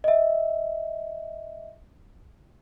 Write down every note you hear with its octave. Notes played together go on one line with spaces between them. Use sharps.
D#5 E5